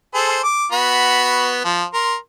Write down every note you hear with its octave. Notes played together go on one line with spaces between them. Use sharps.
G#4 A4 C5
D6
B3 F#4 B5
F3
A#4 C6